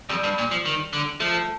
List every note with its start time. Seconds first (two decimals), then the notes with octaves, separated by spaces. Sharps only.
0.09 F2 G3
0.23 G2
0.38 A#2
0.51 F3
0.65 D#3
0.93 D3
1.20 F3 A3